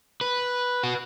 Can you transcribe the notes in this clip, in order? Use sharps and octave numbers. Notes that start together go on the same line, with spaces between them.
B4
F#4